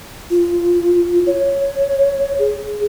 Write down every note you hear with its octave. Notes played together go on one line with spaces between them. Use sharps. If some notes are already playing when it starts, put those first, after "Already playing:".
F4
C#5
G#4